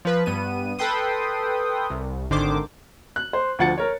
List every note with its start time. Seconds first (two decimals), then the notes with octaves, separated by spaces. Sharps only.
0.05 F3 B4
0.26 G2 B3 D#7
0.79 A4 B4 G5 C6 D#6
1.90 C2
2.30 G#1 D3 D#3 C5 D6
3.16 F#6
3.33 C5
3.59 D2 F3 F#5 A6 C#7
3.78 A#4 C#5